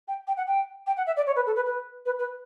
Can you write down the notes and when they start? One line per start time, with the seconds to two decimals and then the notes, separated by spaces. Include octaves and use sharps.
0.08 G5
0.27 G5
0.37 F#5
0.47 G5
0.86 G5
0.97 F#5
1.06 E5
1.16 D5
1.27 C#5
1.36 B4
1.46 A4
1.56 B4
1.66 B4
2.05 B4
2.19 B4